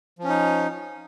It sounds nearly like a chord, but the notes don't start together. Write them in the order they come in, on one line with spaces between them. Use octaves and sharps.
F3 C#4 D#4